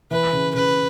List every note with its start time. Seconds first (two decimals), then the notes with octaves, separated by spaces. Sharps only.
0.11 E3 B4
0.32 C#3
0.54 C#3 B4